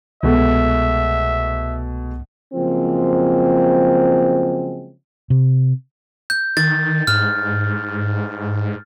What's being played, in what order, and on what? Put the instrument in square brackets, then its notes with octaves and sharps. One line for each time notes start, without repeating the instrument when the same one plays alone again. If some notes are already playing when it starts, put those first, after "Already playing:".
[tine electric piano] C2 [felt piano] B2 G#3 A3 [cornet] E5
[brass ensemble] C#3 F3 F#3 G#3 A#3 C4
[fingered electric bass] C3
[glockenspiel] G6
[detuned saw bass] D#3 [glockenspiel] A6
[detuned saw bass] G#2 [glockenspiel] F6